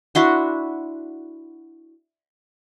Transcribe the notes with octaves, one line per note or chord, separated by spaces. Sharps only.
D4 E4 F#4 C6